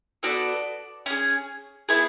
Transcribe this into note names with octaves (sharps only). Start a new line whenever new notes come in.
B3 F#4 A4 D5
C#4 G#4
B3 E4 G#4